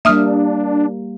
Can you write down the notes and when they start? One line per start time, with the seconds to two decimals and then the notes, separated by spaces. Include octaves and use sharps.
0.05 G3 A#3 D4 E5 D#6 F6